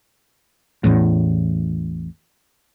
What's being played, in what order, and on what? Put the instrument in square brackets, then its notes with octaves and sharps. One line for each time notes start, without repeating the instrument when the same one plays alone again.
[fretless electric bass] A1 E2 A2